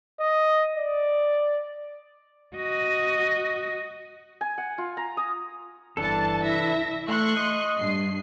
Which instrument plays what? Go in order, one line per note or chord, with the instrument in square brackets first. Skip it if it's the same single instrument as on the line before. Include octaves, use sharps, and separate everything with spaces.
[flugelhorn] D#5
D5
[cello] F#4 D#5
[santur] G#5
F#5
F4
A#5
D#6
[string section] G1 A5 [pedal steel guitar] E3 D4 A4
[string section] E4 E5 A#6
[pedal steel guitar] A3 [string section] C6 C#6 F#6
[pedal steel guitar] D#5
[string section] G2 C7